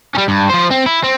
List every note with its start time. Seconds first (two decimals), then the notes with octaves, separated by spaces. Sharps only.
0.15 G3 C#4
0.28 G2
0.49 F3 C5
0.71 C4
0.86 E4
1.04 C4